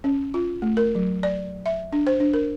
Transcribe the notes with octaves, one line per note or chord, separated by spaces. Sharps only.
C#4
F4
A3
A#4
F#3
D5
E5
D4
C5
D4
A#4